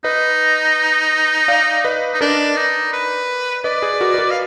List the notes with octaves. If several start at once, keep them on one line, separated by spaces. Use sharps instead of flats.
D#4 B4 D#5
D5 F5
B4 D#5
D#4
D4 A#4 D5
D#4
B4
B4 D5 D#5
G#4 B4
F#4 A#4
B4
F#4 A#4
F5